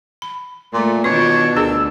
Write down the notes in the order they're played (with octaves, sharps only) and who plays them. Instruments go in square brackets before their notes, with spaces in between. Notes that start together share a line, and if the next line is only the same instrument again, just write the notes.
[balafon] B5
[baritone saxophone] A#2 [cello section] A3
[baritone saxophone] B2 [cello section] D#3 D4 [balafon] F4 [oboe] C#5
[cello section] D2 [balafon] D4 G#4 A#4 [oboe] E6